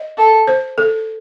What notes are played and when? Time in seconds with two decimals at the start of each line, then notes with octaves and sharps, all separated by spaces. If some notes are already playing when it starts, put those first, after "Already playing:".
Already playing: D#5
0.17 A4
0.47 C5
0.78 A4